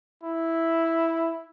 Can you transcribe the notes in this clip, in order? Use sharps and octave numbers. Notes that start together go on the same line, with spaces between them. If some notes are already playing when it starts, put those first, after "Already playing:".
E4